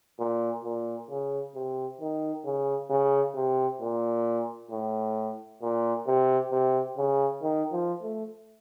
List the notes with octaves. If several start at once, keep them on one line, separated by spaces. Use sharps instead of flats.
A#2
A#2
C#3
C3
D#3
C#3
C#3
C3
A#2
A2
A#2
C3
C3
C#3
D#3
F3
A3